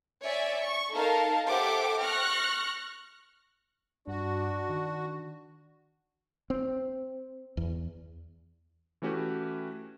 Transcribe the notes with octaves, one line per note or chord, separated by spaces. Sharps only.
C#5 D5 E5 G#5
C#6
D#4 A4 A#4 F5 A5
G4 A4 C5 E5 F#5 D6
C#6 F6 F#6 A#6
G2 D4 F#4
D#3
C4
E2
E3 A3 C#4 F#4 G4 B4